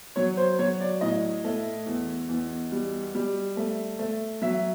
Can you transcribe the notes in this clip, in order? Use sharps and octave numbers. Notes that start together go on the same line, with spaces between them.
F#3 C#5
C5
F#3 C#5
D5
A2 D#5
A3
E2
E2
G3
G3
A3
A3
F#3 E5